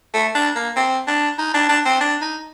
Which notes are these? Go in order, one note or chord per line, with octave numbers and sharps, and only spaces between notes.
A3
D4
A#3
C4
D4
D#4
D4
D4
C4
D4
D#4